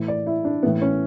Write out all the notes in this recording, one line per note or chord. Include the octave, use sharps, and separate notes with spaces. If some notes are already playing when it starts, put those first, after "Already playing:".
Already playing: A2 E3
D5
E4
D4
A2 E3 B3
C#4